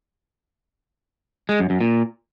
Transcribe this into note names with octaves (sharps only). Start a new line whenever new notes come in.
G#3
F#2
F#2
A#2